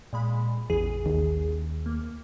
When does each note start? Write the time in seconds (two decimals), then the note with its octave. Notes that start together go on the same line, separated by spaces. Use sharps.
0.13 A#2 G#3 B5
0.70 A1 E2 G#4
1.06 D#2
1.86 A#3